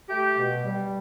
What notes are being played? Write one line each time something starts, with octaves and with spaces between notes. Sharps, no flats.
A3 G4
B2
G3